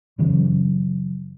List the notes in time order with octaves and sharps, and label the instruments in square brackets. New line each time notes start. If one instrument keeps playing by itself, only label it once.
[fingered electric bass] F#2 C#3 E3 F#3